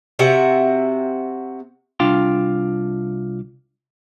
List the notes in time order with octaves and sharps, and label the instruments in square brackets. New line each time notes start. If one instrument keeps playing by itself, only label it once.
[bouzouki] C3 F#4 E5
[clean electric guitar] C2 D4 F4 F5 G5 C6